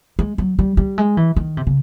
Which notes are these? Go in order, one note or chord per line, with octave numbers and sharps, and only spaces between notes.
G#3
F#3
G3
G3
G#3
E3
D#3
C3
C#3